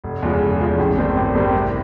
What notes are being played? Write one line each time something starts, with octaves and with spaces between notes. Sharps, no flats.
F1
E2 C#3 F3 G#3
F1
E2 C#3 F3 G#3
A1
G2 D#3 G3 C4
A1
G2 D#3 G3 C4
C2